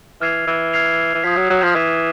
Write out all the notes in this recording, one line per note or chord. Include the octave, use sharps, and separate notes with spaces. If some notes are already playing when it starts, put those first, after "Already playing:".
E3 F6 G#6 C7 F7
E3
F6 G#6 C7 F7
E3
F3 D#6 G#6 B6
F#3
F#3
F3
E3 D#6 G#6 B6